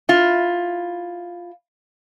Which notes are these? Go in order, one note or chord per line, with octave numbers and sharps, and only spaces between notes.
E4 F4